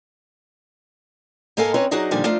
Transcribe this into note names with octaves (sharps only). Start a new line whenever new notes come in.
G#2 A#3 A4 D#5 F5 G#5
C4 C#4 D#4 B4 C#5 D#5
F#3 D4 D#4 F#4 G#4 D#5
A#2 D3 D#3 F3 G3 G#5
F3 A3 D4 D#4 F4